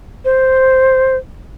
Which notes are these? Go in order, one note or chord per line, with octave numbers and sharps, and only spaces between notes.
C5